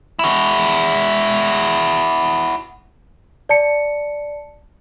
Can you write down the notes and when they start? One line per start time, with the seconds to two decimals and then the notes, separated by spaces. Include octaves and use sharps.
0.19 E4 F#4
3.49 D5 A5 C#7